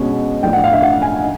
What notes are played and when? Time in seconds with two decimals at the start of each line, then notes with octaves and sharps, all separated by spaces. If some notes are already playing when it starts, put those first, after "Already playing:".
Already playing: B2 G#3 C#4
0.43 A2 F3 A3 D4 G5
0.53 F#5
0.64 F5
0.73 E5
0.82 F#5
1.02 G#5
1.22 D#4